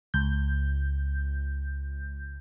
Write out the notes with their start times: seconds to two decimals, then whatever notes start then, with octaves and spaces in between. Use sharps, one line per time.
0.14 C#2 G6